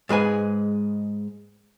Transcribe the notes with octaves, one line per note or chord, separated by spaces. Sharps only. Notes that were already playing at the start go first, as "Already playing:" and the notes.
G#2 G#3 B4 G#5